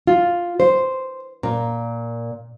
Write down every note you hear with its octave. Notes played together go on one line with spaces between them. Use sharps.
F4
C5
A#2